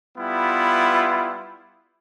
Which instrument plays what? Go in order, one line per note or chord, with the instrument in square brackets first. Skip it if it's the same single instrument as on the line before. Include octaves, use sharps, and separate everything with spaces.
[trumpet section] G3 B3 E4 F4